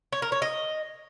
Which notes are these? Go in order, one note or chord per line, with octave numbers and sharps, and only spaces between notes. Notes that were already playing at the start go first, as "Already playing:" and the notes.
C#5
A#4
C#5
D#5